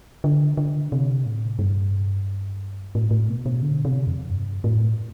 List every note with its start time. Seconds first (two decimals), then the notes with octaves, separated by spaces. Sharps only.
0.24 D3
0.57 D3
0.92 C3
1.26 A2
1.59 G2
2.95 A2
3.11 A2
3.29 B2
3.46 B2
3.62 D3
3.85 C3
4.07 F2
4.29 G2
4.64 A2